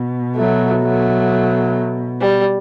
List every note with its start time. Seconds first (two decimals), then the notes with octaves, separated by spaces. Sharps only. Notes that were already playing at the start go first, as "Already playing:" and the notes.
Already playing: B2
0.37 F#3 A3
0.82 F#3 A3
2.21 G3